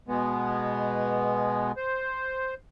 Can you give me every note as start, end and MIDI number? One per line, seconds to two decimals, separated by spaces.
0.08 1.72 47
0.08 1.72 56
0.08 1.72 59
1.77 2.54 72